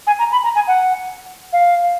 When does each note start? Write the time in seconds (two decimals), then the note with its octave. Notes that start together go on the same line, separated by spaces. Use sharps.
0.07 G#5
0.19 A#5
0.32 B5
0.44 A#5
0.55 G#5
0.68 F#5
1.53 F5